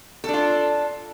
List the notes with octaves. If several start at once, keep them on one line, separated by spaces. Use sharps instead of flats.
D4 F4 A4